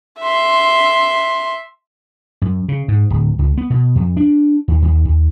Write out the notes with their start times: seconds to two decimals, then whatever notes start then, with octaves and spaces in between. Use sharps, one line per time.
0.20 E5 C6
2.42 F#2
2.68 C#3
2.88 G#2
3.10 D1
3.39 C#2
3.58 B3
3.70 B2
3.96 F2
4.17 D4
4.68 D#2
4.82 D#2
5.05 D#2